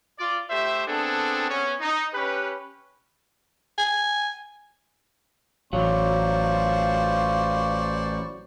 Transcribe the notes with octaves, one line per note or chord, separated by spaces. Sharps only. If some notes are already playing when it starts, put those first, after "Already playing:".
F4 D5
A3 G4 C5 E5
B3 C4 D4 G#4 A4
B3 C#4
D#4
C#4 G4 B4
G#5
A1 F#3 F4 C5 D5 C#6